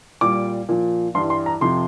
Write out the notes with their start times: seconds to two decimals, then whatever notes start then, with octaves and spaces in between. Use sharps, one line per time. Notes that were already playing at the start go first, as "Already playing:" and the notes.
0.21 A#2 G3 D6
0.69 A#2 F3
1.14 G2 E3 G3 C6
1.30 C6
1.46 A#5
1.61 F2 C3 F3 C6